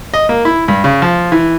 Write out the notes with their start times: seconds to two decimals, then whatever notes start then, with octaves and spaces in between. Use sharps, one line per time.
0.14 D#5
0.29 A#3
0.45 E4
0.68 G2
0.84 C#3
1.02 F3
1.32 E3